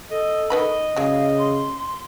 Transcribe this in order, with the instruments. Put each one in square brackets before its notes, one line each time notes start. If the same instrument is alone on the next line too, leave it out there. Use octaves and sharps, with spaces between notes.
[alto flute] A4 [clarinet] D#5
[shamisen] D#3 B4 B5 [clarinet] D#5
[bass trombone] C#3 [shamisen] F#3 G#3 [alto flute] F5
[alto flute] C6